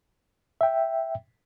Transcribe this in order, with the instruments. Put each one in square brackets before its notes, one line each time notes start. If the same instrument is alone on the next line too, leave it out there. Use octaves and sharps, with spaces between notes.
[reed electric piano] E5 G5